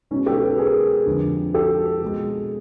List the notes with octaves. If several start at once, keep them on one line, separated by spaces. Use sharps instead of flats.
B2 G#3 C#4 D#4
G4 A4
A4 B4
G#4 A#4
F2 D3 F3 G#3
G4 A4
B2 G#3